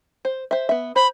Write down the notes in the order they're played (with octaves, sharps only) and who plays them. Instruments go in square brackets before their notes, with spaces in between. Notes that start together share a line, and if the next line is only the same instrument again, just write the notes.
[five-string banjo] C5
C5 E5
B3 E5
[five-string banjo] C5 [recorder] B5